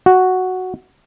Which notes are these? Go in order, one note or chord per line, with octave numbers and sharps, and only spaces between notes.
F#4